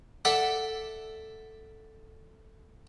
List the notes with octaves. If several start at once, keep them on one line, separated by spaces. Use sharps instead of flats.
A4 D5 E5 F#5